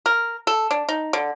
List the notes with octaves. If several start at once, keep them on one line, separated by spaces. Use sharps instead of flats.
A#4
A4
D4
D#4
D3